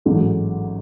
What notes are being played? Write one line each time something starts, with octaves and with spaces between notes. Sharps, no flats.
A1 G#2 F#3 A3